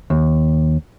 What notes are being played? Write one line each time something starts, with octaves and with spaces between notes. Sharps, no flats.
D#2